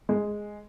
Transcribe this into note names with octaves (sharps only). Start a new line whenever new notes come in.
G#3